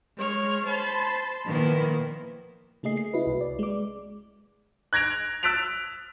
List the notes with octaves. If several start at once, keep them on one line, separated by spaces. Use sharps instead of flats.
G#3 C#5 F6
C5 A5 B5 C6
A#2 D#3 F3 A#3 B3 E4
C#3 A3 A#3 G#4 D#5 C7
C7
C#4 E4 F#4 B4
C2
D5
G#3 D6
F#6 G#6 A#6 D7 F7
E6 F#6 A6 B6 D7 F7